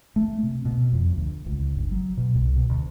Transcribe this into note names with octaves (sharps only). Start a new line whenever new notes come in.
A3
C3
B2
F2
D2
C#2
G1
F#3
B2
C2
B2
D2